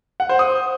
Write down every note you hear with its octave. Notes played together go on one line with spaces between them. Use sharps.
F#5
C5
D#6